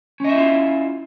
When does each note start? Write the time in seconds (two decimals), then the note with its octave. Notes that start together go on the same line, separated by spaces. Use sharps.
0.20 C#4
0.24 D#5
0.29 E5
0.33 E4
0.38 F4